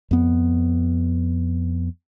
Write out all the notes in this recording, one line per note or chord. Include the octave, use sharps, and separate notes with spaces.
F2 B3